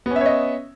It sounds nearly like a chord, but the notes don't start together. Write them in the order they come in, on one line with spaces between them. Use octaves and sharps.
B3 C#4 E5 C#5 D#5